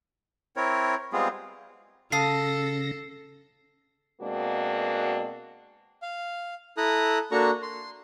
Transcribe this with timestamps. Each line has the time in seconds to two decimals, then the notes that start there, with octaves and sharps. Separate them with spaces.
0.57 C4 E4 A#4 C#5
1.13 G3 G#3 B3 C4 F4 G#4
2.12 C#3 A4 F5 A5 D#6 A#6 C7
4.22 B2 G#3 A#3 C4 D4 F#4
6.02 F5
6.77 E4 A4 A#5 D#6 F#6
7.32 A#3 D4 F#4 A4 A#5 C#6
7.62 C6